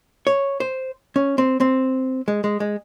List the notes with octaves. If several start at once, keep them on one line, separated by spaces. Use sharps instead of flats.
C#5
C5
C#4
C4
C4
G#3
G#3
G#3